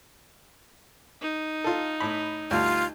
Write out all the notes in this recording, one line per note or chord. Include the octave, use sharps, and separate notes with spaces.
D#4
F4 A4
A2 B5
D2 G3 F4